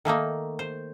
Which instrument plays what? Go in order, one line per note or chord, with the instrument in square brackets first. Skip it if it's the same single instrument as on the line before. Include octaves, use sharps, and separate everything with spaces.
[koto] D#3 A3 A#3 D#4
C5